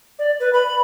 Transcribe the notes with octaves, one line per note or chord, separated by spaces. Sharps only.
D5
B4
B5